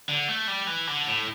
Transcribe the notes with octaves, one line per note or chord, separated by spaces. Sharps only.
D3
A3
G3
E3
D3
A2